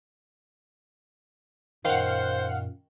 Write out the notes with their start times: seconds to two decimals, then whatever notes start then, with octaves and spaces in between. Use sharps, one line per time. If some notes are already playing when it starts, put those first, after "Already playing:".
1.85 F#2 A#2 D#3 C5 F5 F#5